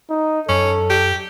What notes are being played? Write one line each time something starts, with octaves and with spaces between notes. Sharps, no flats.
D#4
F#2 C#4 A4
G4